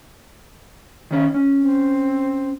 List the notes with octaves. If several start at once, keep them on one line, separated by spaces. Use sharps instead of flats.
D#3 C#4 C#5
C#4
C4